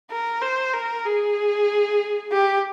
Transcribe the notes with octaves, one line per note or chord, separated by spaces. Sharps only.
A#4
C5
A#4
G#4
G4